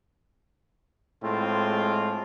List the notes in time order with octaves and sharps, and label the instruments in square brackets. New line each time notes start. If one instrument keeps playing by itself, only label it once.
[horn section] A2 G#3 C4 F4